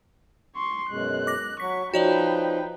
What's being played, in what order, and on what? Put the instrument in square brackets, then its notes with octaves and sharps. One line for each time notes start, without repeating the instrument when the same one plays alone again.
[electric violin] C6 C#6
[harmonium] F#2 B2 G#3 [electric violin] F#6
[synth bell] D6 A#6
[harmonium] F#3 [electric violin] C#6 [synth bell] B6
[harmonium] F3 D#4 [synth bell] F#4 C#5 D5 [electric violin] B4 G5